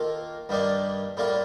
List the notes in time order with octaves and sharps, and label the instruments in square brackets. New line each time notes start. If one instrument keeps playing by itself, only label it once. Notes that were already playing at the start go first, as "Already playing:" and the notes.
Already playing: [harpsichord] D#3 A#3 F4 A4
G2 D#3 G3 A#3 D4
A2 G3 A#3 F4